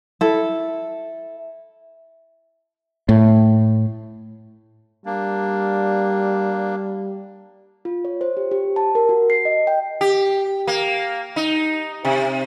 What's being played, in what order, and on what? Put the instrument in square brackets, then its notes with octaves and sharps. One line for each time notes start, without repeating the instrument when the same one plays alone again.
[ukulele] E4 A4
[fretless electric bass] A2
[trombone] G3 [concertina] A#3 D4
[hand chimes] F4
C#5
C5
G4
G4
A5
A#4
F#4
C7
D#5
G5
[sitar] G4
A#3
D#4
C3